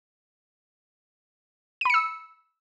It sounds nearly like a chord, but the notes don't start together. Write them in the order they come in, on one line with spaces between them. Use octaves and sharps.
D#7 B5 C#7 E6